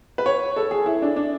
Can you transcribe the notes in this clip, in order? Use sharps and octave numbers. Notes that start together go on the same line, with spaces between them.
B4
C#5
A4
G#4
E4
D4
D4